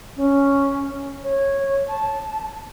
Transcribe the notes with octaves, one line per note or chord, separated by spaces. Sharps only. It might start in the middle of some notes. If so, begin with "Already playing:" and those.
C#4
C#5
A5